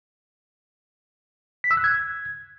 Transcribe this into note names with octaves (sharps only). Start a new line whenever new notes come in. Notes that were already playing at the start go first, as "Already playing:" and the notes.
B6
E6
F#6
G#6